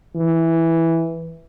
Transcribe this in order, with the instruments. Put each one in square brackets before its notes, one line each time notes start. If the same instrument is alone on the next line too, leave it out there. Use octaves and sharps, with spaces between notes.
[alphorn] E3